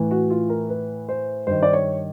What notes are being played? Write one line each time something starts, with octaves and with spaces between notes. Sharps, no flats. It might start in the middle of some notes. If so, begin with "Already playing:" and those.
Already playing: A2 E3
F#4
F4
A#4
B4
C5
G2 D#3 C5
D5
C#5